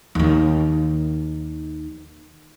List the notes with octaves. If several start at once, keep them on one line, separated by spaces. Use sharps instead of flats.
D#2 D#3